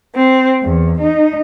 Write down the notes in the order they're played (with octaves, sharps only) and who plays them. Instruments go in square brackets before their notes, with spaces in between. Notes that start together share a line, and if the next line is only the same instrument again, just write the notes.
[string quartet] C4
E2
D#4